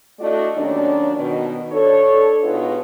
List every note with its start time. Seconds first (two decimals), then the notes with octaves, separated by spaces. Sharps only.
0.20 A3 D4 E4 F#4 D5 D#5
0.56 D#2 F#3 C#4 D4
1.16 B2 D#3
1.71 D4 A4 C#5
2.44 B2 G#3 B3 D#4 F4 B4